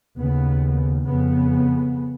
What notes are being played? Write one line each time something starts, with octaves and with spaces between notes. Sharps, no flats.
D#2 C#3 B3
F2 C#3 B3